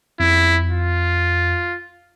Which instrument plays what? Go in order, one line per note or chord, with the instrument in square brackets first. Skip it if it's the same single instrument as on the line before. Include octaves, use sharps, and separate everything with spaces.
[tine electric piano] F2 [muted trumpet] E4
[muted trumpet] F4